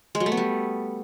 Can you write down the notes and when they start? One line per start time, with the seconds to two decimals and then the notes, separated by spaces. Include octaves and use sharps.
0.15 G#3
0.20 F#3
0.26 A3
0.32 B3
0.37 G3